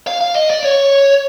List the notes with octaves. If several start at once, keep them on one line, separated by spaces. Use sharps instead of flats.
F5
F5
D#5
D5
C#5